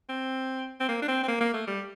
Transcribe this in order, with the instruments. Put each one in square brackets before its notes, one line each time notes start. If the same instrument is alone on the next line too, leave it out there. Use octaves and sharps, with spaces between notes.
[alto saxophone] C4
C4
A#3
D4
C4
C4
A#3
A#3
A3
G3